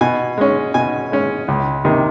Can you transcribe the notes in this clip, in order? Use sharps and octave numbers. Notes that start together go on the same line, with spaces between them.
B2 G#5
G#3 C#4
B2 G#5
G#3 C#4
C#2
C3 D#3